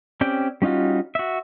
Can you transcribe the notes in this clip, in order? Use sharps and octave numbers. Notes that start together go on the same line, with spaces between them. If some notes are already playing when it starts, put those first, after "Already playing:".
C4 C#4 G4 D5 G5
G3 C#4 D#4 F4 F#4
F#4 E5